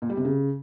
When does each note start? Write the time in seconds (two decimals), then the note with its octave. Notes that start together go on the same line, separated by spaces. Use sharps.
0.02 A#2
0.09 G3
0.17 C3
0.25 C#3